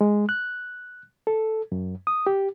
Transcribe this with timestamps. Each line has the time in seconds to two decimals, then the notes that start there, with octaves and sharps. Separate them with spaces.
0.01 G#3
0.29 F#6
1.27 A4
1.72 F#2
2.07 D#6
2.27 G4